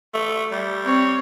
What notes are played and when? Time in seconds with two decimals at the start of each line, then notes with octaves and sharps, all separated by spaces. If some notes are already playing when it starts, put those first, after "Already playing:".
0.14 A3
0.52 G3
0.84 C4 C#5